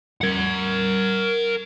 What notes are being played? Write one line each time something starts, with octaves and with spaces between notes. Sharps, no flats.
A#4 F#5